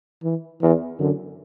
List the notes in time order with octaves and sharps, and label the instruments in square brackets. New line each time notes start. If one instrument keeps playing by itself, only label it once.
[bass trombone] E3
[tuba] E2 [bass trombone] E3
[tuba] F#2 [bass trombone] D3